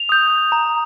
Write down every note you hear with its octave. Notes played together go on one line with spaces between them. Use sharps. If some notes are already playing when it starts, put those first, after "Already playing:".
Already playing: F7
D#6 G6
A#5